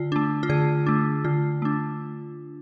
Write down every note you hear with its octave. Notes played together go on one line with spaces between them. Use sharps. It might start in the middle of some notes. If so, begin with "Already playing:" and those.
Already playing: D3 F4
A3 D4
F4
D3 G#4
A3 D4
D3 F4
A3 D4